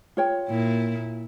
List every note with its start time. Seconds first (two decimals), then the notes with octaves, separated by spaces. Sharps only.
0.17 F4 C#5 G5
0.49 A#2 E4